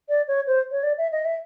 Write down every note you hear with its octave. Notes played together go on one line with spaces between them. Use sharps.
D5
C#5
C5
C#5
D5
E5
D#5
E5